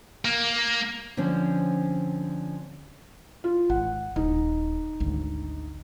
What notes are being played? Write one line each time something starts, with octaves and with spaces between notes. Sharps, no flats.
A#3
D3 F3 C4 C#4
F4
G#1 F#5
D#1 D#4
G#1 D2